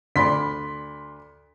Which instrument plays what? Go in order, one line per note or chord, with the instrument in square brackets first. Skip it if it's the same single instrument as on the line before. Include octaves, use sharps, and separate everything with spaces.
[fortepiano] D2 D5 [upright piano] B5 C6 B6